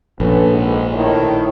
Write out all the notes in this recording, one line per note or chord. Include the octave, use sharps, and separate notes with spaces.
A#1 A#2 C#4 A4 B4
G#2
A2 D#3 C#5